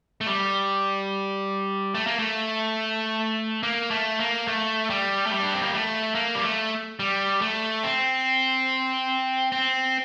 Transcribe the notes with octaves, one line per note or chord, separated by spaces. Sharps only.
A3
G3
A3
A#3
A3
A#3
A3
A#3
A3
G3
A3
G3
D4
C4
A#3
A3
A#3
G3
A3
G3
A3
C4
C4